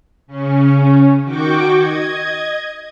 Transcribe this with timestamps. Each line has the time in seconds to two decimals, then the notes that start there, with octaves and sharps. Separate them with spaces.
0.27 C#3 C#4
1.24 D#3 F#4 G5 C#6 D6
1.76 D#5 G#6